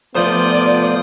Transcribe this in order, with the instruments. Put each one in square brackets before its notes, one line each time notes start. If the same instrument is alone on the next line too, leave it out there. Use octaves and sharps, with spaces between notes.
[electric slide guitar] F3 A3 C5 [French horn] B3 [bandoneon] F4 D#6 G6 [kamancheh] D5